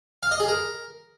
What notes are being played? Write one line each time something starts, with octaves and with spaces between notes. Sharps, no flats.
F5
D#5
G#4
A#4